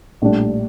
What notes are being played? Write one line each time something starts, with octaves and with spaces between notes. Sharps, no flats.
A#1 A2 G3 D4